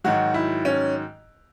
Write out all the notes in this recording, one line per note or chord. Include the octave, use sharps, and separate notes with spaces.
G#2 D#3 F#3 F#4
E4
C#4